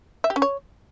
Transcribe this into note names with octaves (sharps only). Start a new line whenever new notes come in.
E5
G4
C#4
C#5